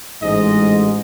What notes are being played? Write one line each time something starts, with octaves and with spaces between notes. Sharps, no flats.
A1 G#2 G#3 D#5